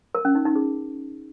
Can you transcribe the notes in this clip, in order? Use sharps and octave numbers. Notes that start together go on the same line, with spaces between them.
A#4
C#4
D#4
D#4
G#4